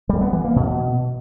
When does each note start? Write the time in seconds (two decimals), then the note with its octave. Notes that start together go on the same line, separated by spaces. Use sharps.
0.09 G3
0.21 B3
0.33 E3
0.44 A#3
0.56 B2